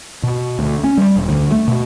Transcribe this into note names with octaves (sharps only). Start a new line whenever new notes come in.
B2
D2
C#4
G3
E1
D2
A3
B2